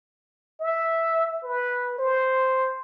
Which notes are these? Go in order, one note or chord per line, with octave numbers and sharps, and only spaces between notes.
E5
B4
C5